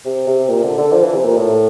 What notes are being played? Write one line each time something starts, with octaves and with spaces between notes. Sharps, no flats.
C3
C3
A#2
D3
D3
F3
E3
C3
A#2
A2